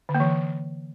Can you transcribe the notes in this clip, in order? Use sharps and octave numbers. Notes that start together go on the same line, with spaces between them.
D3
A#3
E3